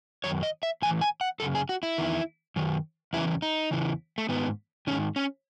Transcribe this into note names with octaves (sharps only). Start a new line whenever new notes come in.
F#2 D#3 C#5
D#5
E5
A2 E3 G#5
G#5
F#5
F#2 C#3 A4
G#4
F#4
E4
E2 D#3
F#2 D#3
E2 C#3 E3 E4
D#4
E2 C#3 E3
A3
G#2 D#3 B3
G#2 D#3 C#4
C#4